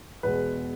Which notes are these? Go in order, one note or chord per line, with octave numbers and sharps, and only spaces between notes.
E2 B2 G#3 B4